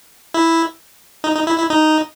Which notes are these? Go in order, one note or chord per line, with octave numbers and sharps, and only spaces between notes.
E4
D#4
D#4
E4
E4
D#4